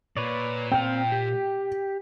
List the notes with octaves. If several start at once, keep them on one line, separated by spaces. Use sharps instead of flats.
A#2 B4 C#5 D5
C4 F5 G5
G4